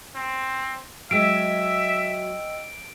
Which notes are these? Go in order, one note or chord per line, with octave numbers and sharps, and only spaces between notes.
C4
F#3 G#3 D#5 E5 G5 E6 D7